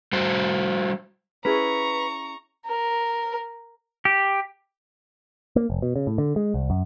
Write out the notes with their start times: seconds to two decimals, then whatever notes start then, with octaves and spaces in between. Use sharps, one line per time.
0.13 G3 F#4 C5
1.45 C#4 E4 G#4 B4 A#5 C#6
2.66 A#4
4.05 G4
5.56 A#3
5.70 F1
5.82 B2
5.96 C#3
6.07 A2
6.18 D3
6.36 G#3
6.54 C2
6.70 F#2